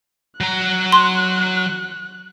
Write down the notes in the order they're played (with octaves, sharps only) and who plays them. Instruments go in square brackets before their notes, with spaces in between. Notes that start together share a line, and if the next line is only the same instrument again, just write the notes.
[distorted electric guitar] F#3 A#5 [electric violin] F#6
[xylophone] C6